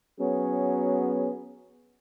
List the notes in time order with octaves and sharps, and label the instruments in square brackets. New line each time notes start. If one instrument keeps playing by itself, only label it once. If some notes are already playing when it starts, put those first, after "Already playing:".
[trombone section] F#3 B3 C#4 G#4